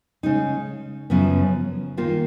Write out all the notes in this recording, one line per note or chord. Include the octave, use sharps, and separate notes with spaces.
C#3 G#3 D#4
F#2 C#3 F3 B3
D#3 A#3 F4